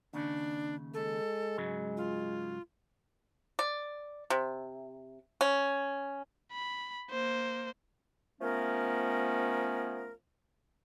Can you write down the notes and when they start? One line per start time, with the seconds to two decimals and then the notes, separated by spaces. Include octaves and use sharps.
0.13 D#2 C#3 D4
0.94 G#3 A4
1.57 G#2 C#3 F#3
1.97 F4
3.59 D5
4.30 C3
5.41 C#4
6.52 B5
7.11 A#3 C5
8.41 F3 A3 B3 C#4 A#4